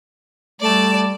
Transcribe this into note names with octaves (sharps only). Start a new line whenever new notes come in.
G3 A3 D5 A5